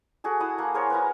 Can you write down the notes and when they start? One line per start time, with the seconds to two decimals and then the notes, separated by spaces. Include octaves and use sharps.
0.24 F#4 G#4 A4
0.40 E4 F#5 A5 D#6
0.58 A#3 B5
0.74 G#4 A#4 C5 C#5
0.90 E4 A#4 B4